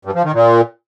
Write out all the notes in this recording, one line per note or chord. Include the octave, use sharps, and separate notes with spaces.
G2
F3
D#3
A#2